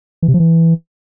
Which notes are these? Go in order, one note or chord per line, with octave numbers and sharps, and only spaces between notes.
E3
C3
F3
E3